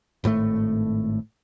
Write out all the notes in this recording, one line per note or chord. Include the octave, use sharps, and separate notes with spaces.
G#1 A2 D3 A3